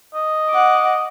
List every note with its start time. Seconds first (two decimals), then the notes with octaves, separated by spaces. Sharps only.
0.15 D#5
0.50 F#5 D6